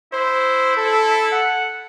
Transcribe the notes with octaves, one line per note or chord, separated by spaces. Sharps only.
E4 C5
A4
F#5